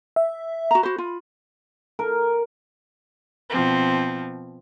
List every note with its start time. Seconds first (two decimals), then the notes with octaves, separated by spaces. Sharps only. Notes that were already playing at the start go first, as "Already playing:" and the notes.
0.16 E5
0.71 F#4 A#5
0.83 F#4 C5 B5
0.98 F4
1.99 A#4
3.50 B2 F3 C4